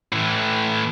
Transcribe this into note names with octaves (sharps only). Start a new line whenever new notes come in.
A2 E3